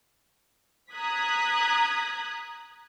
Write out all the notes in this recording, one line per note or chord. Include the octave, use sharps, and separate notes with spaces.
A#5 D#6 F#6 G#6 B6